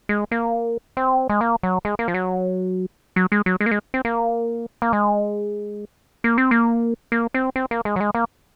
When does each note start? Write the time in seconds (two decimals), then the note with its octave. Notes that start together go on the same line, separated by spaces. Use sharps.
0.09 G#3
0.31 A#3
0.97 C4
1.29 G#3
1.41 A#3
1.63 F#3
1.85 G#3
1.99 A#3
2.08 F3
2.14 F#3
3.16 F#3
3.32 G#3
3.46 F#3
3.61 G#3
3.66 A#3
3.71 G#3
3.94 C4
4.05 A#3
4.82 A#3
4.93 G#3
6.24 A#3
6.38 C4
6.51 A#3
7.12 A#3
7.34 C4
7.56 C4
7.71 A#3
7.85 G#3
7.96 F#3
8.00 G#3
8.15 A#3